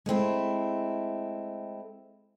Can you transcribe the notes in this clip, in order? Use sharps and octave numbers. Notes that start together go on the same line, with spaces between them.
G#3 A3 C4 E4